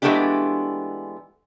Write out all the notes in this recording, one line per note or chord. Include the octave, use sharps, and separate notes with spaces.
E3 G#3 A3 B3 D4 G4